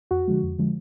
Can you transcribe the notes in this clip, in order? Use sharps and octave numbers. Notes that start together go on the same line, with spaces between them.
F2 F#4
D3 F3 G#3
F2
D3 F3 G#3